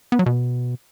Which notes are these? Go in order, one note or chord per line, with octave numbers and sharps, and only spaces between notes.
B3
F#3
B2